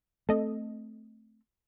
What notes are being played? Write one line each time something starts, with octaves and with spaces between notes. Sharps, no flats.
A3 C4 A4 D#5